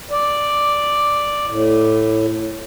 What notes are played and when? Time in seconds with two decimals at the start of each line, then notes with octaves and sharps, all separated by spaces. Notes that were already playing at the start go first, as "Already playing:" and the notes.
0.11 D5
1.48 A2